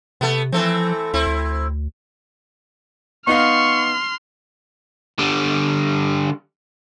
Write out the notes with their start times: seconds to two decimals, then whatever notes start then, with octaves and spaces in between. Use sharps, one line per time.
0.21 C3 A3 B3
0.52 E3 F3 A3 C4
1.14 D2 C4 E4
1.27 D2
3.27 B3 D#4 F5 C6 C#6 F6
5.19 D3 G3